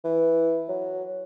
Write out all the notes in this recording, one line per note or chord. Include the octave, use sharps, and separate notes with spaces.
E3
F#3